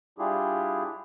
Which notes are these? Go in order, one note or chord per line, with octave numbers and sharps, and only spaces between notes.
G3 D4 E4 F4 G4 G#4